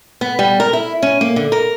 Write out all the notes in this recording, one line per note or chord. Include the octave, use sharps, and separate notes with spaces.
B3
G3
A#4
E4
C#4
A#3
D3
A#4